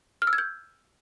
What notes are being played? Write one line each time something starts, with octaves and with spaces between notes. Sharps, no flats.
F6
E6
G#6
G6